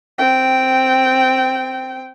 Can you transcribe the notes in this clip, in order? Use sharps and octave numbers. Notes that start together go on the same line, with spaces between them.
C4 G5